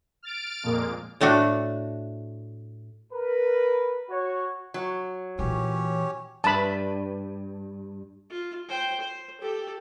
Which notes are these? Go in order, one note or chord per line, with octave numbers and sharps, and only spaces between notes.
F6 A6 D7
F2 A#2 G#3 A#3
A2 A3 D4 F#4
A#4 B4
F#4 C#5
F#3
A#2 E3 C#4 G4 C#5
G2 A5 B5
F4
C5 G5
C5
G4 A4